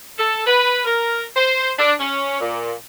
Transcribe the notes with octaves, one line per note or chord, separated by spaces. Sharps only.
A4
B4
A#4
C5
D4
C#4
A#2